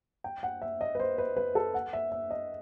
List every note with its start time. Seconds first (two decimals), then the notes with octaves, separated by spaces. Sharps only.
0.24 G5
0.43 F#5
0.62 E5
0.81 D#5
0.95 B4
1.00 C5
1.18 B4
1.37 B4
1.55 A4
1.74 F#5
1.93 E5
2.12 E5
2.31 D#5